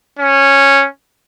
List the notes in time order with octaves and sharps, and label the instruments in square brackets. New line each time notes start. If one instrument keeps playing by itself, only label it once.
[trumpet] C#4